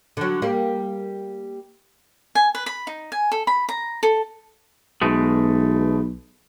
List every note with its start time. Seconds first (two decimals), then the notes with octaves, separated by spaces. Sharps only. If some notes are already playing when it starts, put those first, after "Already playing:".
0.17 D3 F#3
0.42 G3 A#3
2.35 G#5
2.55 B4
2.66 B5
2.87 D#4
3.12 G#5
3.32 A4
3.47 B5
3.69 A#5
4.03 A4
5.02 B1 B2 G#3 A3